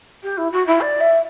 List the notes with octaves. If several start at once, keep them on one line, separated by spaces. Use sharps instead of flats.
G4
E4
F#4
E4
D5
E5